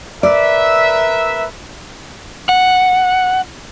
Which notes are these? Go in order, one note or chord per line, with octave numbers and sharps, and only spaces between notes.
A#4 B4 D5 E5
F#5